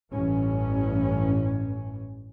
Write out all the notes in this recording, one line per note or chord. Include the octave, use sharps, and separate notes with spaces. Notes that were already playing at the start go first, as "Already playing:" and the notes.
A1 G2 E3 C#4